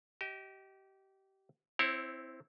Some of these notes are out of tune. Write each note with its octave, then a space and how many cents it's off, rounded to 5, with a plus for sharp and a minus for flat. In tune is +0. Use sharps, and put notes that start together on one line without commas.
G4 -25 D#5 +25
C4 +0 E4 +0 C#5 -35